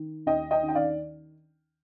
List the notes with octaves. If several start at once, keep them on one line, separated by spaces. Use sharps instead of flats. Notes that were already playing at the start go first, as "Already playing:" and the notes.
Already playing: D#3
D#2 D#5 G5
D#5 G5
D#3
G5
D5 F5